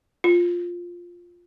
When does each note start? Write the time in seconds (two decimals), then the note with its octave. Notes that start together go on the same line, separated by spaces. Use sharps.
0.24 F4